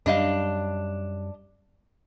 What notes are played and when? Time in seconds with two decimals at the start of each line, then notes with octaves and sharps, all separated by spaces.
0.06 F#2 G3 D4 D#5 F5